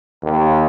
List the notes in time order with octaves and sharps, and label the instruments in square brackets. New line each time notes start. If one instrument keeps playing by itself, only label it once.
[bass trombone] D#2